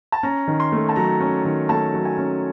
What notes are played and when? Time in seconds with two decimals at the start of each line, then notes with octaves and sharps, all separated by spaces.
0.12 A5
0.23 C#4 A#5
0.47 D#3
0.60 C6
0.72 A3
0.89 A5
0.96 F#3 A#5
1.20 C#4
1.45 D#3
1.69 A3 A5
1.94 F#3
2.05 G#5
2.18 C#4